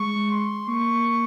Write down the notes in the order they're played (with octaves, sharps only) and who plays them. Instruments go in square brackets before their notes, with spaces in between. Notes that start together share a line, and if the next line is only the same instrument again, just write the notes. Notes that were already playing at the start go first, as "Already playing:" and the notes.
Already playing: [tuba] G#3 [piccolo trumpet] C#6
[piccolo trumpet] C6
[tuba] A#3 [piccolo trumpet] C#6